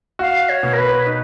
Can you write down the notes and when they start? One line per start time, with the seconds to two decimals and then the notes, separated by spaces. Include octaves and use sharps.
0.19 F#4 F5
0.49 C#5
0.63 B2
0.73 A#4
0.78 B4
1.06 D#4